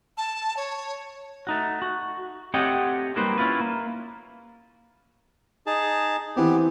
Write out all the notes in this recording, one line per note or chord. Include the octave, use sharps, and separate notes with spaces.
A5
C#5
A3 D#4 F#4
F#4
A3 C4 G4 C#5 D#5 F#5
F#3 G3 A#3 D#4 B4 C5
C#4 E4 F4 B4
A#3
D#4 G#4 A5
E3 B3 C4 G4